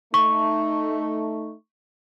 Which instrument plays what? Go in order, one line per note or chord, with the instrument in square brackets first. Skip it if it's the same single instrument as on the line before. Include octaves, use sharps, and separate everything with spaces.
[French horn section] A3 D#4 [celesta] C#6